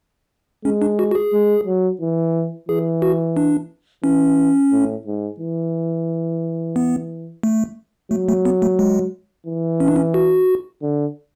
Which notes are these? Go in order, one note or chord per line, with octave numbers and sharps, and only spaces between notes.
G#3 C#4
D4
F#4
F#4
G#4
G#3
F#3
E3
E3 G#4
F#4
D4
E3 C#4
A2
G#2
E3
B3
A3
F#3 A3
A3
B3
A3
G#3
E3
C#4
D4
C#4
F#4
D3